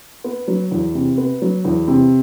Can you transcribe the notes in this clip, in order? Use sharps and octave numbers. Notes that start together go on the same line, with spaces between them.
B3
F#3
E2
C3
B3
F#3
E2
C3